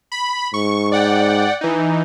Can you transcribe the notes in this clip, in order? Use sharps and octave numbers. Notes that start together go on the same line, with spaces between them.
B5
G#2 C#6
D5 F#5 G5
E3 D#4